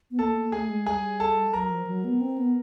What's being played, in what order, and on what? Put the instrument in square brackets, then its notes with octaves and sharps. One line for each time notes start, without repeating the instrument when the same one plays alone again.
[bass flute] B3
[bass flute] A#3 [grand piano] A4 A5
[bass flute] A#3
[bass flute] A3 [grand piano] G#4 G#5
[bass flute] G#3
[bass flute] G3 [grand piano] G#4 G#5
[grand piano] A4 A5
[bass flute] F#3 [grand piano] A#4 A#5
[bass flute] F3
F#3
B3
C4
B3